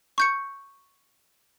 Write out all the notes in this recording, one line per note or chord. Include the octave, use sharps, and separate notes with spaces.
C#6 G6 C#7